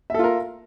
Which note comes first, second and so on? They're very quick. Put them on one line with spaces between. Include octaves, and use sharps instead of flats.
E5 A4 F4 A#4